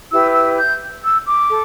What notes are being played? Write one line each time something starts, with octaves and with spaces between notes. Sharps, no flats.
E4 G4 B4 E6
E6
G6
E6
D6
A4